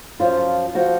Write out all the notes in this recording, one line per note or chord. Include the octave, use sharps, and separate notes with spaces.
F#2 F3 F4
F3 F#4